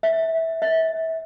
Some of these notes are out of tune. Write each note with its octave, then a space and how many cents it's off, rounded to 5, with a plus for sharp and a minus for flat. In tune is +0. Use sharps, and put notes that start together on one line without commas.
E5 -15
E5 -30